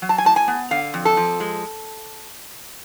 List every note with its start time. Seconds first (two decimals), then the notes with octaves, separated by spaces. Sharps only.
0.02 F#3
0.09 A5
0.18 G#5
0.25 A2 A5
0.36 G#5
0.48 B3
0.71 D3 F5
0.94 F2
1.05 A4
1.17 F3
1.40 G#3